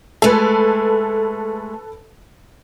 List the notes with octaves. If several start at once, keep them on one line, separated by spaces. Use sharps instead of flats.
G#3 A3 A4 B4